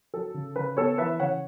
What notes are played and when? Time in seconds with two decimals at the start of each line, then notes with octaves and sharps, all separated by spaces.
0.14 F#3 A4
0.34 C#3
0.56 C#3 B4
0.77 B3 A4 C#5
0.98 E3 B4 E5
1.20 C#3 C#5 F#5